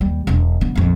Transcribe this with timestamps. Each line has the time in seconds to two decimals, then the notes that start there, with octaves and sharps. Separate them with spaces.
0.01 D#2 G3
0.27 E1 D4
0.61 D3 B3
0.75 A#1 F2